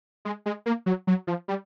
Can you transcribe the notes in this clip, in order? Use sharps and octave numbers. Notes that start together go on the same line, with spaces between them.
G#3
G#3
A#3
F#3
F#3
F3
G3